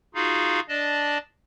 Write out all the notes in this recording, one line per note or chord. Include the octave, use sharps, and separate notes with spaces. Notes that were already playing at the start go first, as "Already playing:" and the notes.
D#4 F4 F#4 G#4 F5
D4 D5 D#5 A5